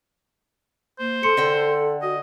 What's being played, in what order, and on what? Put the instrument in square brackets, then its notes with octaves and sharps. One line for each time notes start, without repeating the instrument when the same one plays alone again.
[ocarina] A#3 [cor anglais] C5
[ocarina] A4 [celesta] C6 C#7
[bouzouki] D3 G5 [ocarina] A4
[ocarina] F#4 [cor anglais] D#5